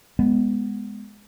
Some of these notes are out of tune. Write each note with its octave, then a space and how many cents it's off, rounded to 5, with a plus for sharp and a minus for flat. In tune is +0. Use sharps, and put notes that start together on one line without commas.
G#3 +0 B3 +0